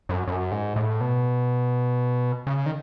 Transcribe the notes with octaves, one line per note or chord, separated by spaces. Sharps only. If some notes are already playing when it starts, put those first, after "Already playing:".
F#2
F#2
G#2
A2
B2
C#3
D#3